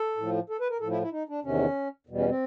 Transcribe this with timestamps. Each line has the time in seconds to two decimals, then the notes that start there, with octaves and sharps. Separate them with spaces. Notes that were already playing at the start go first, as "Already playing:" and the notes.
Already playing: A4
0.17 A2 F3
0.50 A4
0.60 B4
0.70 A#4
0.81 A2 F3 A4
0.91 E4
1.02 E4
1.12 D#4
1.29 D4
1.44 E2 C3 D#3 C#4
2.07 E2 B2 G3
2.18 C#4
2.28 C4